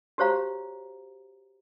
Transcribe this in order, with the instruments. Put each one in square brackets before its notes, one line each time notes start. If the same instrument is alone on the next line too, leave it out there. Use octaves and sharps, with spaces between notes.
[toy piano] F#4 G4 C5 C#5 F5 A#5